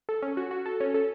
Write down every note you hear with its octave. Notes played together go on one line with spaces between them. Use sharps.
A4
C#4
F#4
F#4
A4
C#4
A4